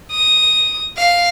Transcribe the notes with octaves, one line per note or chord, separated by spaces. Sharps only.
D#6
F5